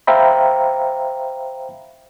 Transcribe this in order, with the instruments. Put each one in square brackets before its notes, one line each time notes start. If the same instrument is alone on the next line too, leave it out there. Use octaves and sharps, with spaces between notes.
[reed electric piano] C5 E5 F5 G5 A#5 B5